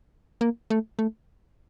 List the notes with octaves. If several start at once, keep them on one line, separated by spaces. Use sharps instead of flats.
A#3
A3
A3